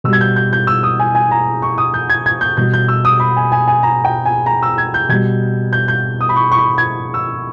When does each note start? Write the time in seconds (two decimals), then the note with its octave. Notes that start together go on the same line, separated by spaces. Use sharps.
0.04 B2 G3 E6
0.13 G#6
0.21 G6
0.36 G6
0.53 G6
0.67 E6
0.83 D#6
0.99 G#5
1.15 G#5
1.31 A#5
1.62 C#6
1.78 D#6
1.94 G6
2.10 G#6
2.26 G#6
2.41 G6
2.57 B2 G3 G6
2.73 G6
2.88 E6
3.05 D#6
3.20 B5
3.37 G#5
3.52 G#5
3.67 G#5
3.83 A#5
4.04 G5
4.25 G#5
4.46 A#5
4.63 E6
4.78 G#6
4.94 G6
5.09 B2 G3 G#6
5.73 G6
5.88 G6
6.21 D#6
6.29 B5
6.36 C#6
6.52 C#6
6.57 B5
6.78 G#6
7.14 E6